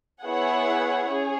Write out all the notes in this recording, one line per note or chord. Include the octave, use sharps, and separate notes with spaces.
B3 E4 G#4 C#5 F#5
C#4 G#4 C#5